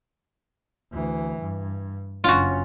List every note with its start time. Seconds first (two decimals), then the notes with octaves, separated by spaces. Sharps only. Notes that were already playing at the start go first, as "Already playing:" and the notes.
0.92 D2 E3
1.41 G2
2.24 F#1 C#4 F4 F#4